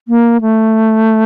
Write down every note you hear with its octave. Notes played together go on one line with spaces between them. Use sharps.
A#3
A3